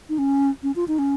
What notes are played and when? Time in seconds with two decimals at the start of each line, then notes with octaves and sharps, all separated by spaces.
0.09 D#4
0.18 C#4
0.63 C#4
0.76 F4
0.88 D#4
0.99 C#4